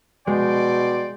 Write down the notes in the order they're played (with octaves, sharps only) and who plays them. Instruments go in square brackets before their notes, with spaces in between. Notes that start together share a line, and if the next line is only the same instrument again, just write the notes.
[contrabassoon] B2 [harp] G#3 [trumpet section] D5 G5 C6